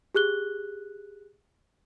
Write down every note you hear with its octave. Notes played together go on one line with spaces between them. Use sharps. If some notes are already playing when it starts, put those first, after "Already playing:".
G4 G#4 F#6 G7